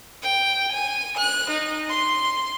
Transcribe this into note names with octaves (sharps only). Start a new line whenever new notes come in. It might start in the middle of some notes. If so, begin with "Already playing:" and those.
G5
G#5
F#6
D#4
C6